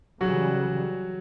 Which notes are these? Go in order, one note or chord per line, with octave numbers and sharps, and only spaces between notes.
C#3 E3 F#3 G3 F#4